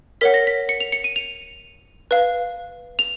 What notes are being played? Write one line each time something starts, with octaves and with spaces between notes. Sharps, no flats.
A#4 C#5 F#5 B6
A#6
B6
C#7
F7
C#7
D#7
F7
B4 F5
F7